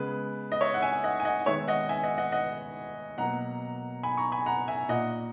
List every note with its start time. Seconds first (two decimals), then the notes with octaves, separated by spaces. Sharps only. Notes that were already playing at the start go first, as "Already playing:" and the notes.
Already playing: C#3 G#3 B3 B4
0.52 D#5
0.61 C#5 E5
0.74 F#5
0.82 E5 G#5
1.04 D#5 F#5
1.20 G#5
1.25 D#5 F#5
1.46 D#3 G#3 B3 C#5 E5
1.68 D#5 F#5
1.89 E5 G#5
2.03 D#5 F#5
2.18 D#5 F#5
2.32 D#5 F#5
3.18 B2 F#3 A#3 F#5 A#5
4.03 G#5 B5
4.17 A#5 C#6
4.32 G#5 B5
4.46 F#5 A#5
4.68 E5 G#5
4.89 A#2 A#3 D#5 F#5